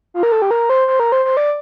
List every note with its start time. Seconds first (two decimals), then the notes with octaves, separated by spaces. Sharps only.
0.14 F4
0.23 A#4
0.32 A4
0.42 G4
0.51 A#4
0.69 C5
0.88 C5
1.00 A#4
1.12 C5
1.25 C5
1.37 D5